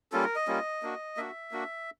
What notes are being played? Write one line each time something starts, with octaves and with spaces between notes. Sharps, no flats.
G3 A#3 C#4 F4 A4
A#4
D#5
G3 A#3 C#4 F4
A#3 D4 F#4
A#3 D4 F#4 E5
A#3 D4 F#4